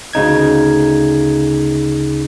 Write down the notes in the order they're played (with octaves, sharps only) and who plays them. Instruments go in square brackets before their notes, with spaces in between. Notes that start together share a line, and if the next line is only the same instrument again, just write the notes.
[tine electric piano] D2 C#3 D#4 G#6